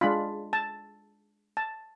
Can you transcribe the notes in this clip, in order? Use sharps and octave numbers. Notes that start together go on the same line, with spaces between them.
G#3 D4 F4 B5
A5
A5